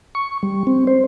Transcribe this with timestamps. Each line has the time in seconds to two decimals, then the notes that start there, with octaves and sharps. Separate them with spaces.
0.15 C#6
0.43 G3
0.67 C4
0.87 C5